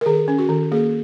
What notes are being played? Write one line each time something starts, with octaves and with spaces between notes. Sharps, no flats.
A#4
D#3 G#4
C#4
F#4
D#3
A#3 G#4